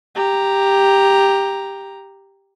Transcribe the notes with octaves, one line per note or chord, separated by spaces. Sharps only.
G4 A#5